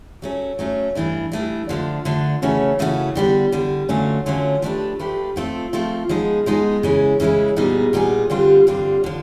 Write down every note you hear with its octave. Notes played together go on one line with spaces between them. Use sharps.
F#3 A3 C#4
F#3 A3 C#4
G2 E3 A3 D4
G2 E3 A3 D4
D3 F3 A3 D4
D3 F3 A3 D4
C#3 E3 A3 C#4 F#4
C#3 E3 A3 C#4 F#4
D3 G3 B3
D3 G3 B3
D3 F#3 A3 C#4 F4
D3 F#3 A3 C#4 F4
F3 A3 D4 G4 B4
F3 A3 D4 G4 B4
F3 A3 C4 F4 A4
F3 A3 C4 F4 A4
F3 G#3 B3 D#4 G#4
F3 G#3 B3 D#4 G#4
C#3 E3 G#3 C#4 E4
C#3 E3 G#3 C#4 E4
A#2 G3 B3 D#4 G#4
A#2 G3 B3 D#4 G#4
G2 D3 G3 C4 F4
G2 D3 G3 C4 F4
D3 F3